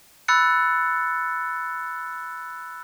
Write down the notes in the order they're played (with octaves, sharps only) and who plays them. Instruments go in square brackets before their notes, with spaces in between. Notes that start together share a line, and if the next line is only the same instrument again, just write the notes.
[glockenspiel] B5 E6 F#6 A6 C#7